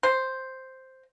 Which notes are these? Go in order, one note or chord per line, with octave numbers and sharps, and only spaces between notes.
C5